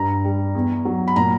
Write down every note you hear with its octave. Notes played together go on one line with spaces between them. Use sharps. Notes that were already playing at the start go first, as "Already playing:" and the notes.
Already playing: G2 A#5
G3
E2
F#3
B5
A#2 A#5